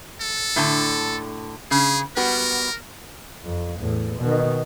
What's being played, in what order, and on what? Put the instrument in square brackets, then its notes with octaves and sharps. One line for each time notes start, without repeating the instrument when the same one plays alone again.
[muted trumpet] A4
[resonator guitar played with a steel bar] A2 D3 A5
[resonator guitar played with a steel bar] C#3 [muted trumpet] G#4
[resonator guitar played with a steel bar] G3 B3 F#4 [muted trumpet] A#4
[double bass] F2
E2 A2
B2 D#3